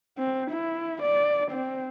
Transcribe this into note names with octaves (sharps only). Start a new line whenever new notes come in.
C4
E4
D5
C4